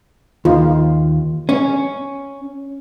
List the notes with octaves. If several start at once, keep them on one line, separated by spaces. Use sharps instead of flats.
D#2 F4
C#4